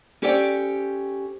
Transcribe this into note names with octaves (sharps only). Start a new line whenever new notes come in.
C#4 G4 A4 C5 D5 G5